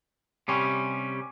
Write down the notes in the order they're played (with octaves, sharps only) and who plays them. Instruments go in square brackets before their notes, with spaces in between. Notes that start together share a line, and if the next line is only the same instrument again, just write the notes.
[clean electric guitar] C3 G3 C#4